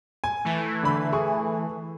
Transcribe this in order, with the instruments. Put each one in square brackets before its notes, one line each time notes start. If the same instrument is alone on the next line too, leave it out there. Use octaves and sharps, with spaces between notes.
[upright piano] G#5
[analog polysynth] E3 A3
[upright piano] D3 B5
G#4 C#6